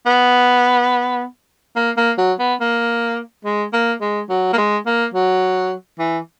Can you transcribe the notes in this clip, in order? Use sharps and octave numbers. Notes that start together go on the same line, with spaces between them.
B3
A#3
A#3
F#3
B3
A#3
G#3
A#3
G#3
F#3
A#3
G#3
A#3
F#3
E3